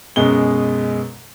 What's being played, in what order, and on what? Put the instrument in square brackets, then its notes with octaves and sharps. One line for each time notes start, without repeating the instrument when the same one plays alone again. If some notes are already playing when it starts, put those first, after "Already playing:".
[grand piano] F#2 B2 G#3 G7